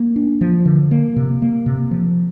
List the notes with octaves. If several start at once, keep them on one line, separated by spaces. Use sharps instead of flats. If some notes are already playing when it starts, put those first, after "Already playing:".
Already playing: A#3
D4
F3
D3
A#3
C3
A#3
C3
F3